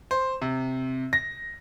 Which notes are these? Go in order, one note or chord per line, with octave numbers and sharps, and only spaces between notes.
C5
C3
A#6